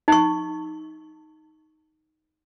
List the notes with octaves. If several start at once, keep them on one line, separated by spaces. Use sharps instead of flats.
D#4 C#6